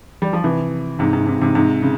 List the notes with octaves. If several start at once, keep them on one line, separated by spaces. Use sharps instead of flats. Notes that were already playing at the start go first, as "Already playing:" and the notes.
G3
F3
C3 E3
G#2 C3
G#2
G#2 C3
G#2 C3
G#2 C3
C#3